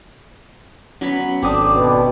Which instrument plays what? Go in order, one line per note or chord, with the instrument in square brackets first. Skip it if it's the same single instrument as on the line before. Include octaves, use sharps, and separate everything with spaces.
[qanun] F#3 B3 B5 [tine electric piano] C#4
[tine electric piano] G#1 A4 D#6 [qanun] C4 D4 [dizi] D6
[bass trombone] B2 [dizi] D5